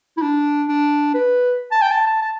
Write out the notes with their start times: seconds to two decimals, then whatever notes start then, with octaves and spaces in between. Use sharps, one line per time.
0.17 E4
0.22 D4
0.68 D4
1.14 B4
1.72 A5
1.82 G5
1.91 A5
2.07 A5
2.22 A5